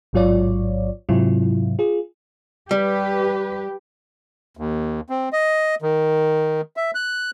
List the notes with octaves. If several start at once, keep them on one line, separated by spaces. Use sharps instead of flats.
A1 G#2 F#3 F4 C#5 D5
G#2 C3 F#3 C4 E4 F4
F4 G#4
G3 G4 B4
D#2
C4
D#5
D#3
E5
F#6